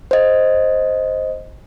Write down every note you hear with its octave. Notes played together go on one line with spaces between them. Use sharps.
C5 D#5